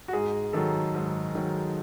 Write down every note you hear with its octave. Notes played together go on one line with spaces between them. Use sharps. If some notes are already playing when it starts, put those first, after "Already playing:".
F#4
G#2 G#4
D#3 F#3 A4
G#2
D#3 F#3